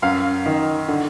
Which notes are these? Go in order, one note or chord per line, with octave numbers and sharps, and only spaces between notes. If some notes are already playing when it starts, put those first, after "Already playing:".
F#2 F5
D#3
D3